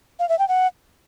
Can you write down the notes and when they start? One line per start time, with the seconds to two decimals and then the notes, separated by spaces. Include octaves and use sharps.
0.19 F5
0.29 E5
0.39 G5
0.48 F#5